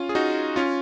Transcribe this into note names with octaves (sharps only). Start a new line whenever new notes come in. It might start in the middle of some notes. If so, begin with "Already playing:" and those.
Already playing: C#4 F4
G#4
D#4 F#4
C#4 F4